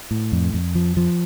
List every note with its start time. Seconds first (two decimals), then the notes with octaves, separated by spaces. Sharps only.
0.11 A2
0.32 F2
0.54 F2
0.75 F3
0.97 F3